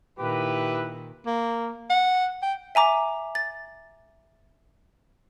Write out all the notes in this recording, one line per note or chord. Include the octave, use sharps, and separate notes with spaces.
A#2 D#3 E4 G4 B4
A#3
F#5
G5
E5 G#5 A#5 D6
A6